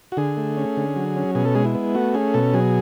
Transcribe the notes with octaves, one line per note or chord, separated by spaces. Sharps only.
F#4
D3 G#4
A3
C#4
D3
F#3
C#4
B2 G#4
A4
G#3 G#4
E4
B3
A3 F#4
C#4 G#4
B2 A4
F#3 G#4